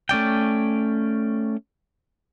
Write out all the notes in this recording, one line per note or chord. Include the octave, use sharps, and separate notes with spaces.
A3 C#4 D5 G5